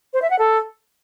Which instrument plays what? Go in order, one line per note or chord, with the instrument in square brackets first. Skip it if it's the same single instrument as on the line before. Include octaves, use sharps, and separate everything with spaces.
[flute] C5
E5
F#5
A4